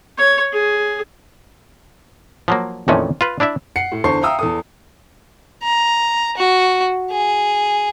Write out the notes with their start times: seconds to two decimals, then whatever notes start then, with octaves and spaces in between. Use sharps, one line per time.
0.18 C#5
0.53 G#4
2.48 F3 F#3 A#3
2.88 F2 A#2 D#3 E3 A3 C#4
3.21 F4 B4
3.40 D4 E4 D5 E5
3.76 F#5 C7 C#7
3.92 A2
4.04 E2 D3 C5 A5 C#6 C7
4.21 E5 F5 G5 A#5 D#6 E6
4.39 E2 A4 D#6
5.63 A#5
6.37 F#4
7.11 G#4